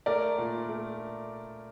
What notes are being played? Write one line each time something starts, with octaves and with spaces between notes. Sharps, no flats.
A3 A#4 D5
A#2
A3